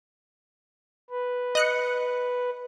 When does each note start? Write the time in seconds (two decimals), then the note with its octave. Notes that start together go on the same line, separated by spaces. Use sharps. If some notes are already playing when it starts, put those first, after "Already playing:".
1.10 B4
1.55 D#5 F#6 C#7